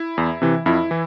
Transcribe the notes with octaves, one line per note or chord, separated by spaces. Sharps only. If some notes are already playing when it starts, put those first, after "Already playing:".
Already playing: E4
E2
C3 E3
F2 E4
E3